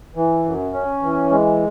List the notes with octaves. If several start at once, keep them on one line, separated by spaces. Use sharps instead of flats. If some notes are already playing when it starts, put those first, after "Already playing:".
E3
F#2
C#4
E3
G#3